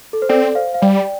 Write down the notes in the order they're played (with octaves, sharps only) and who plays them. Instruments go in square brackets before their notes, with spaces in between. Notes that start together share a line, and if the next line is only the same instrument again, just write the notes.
[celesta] A4
C5
[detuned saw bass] C4 [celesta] A4 D5
[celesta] C5 F5
F5
[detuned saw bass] G3 [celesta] D5 G5